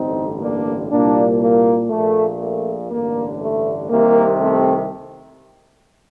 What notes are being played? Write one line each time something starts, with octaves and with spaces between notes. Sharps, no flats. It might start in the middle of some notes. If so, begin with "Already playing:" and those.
Already playing: A1 G2 D3 C4 D#4
A#3 D4
C2 A#2 A#3 D4
A#3
A#1 A#2 A3
A3
A1 G2 D3 A#3
A3
C2 C3 D#3 A#3
A3 C4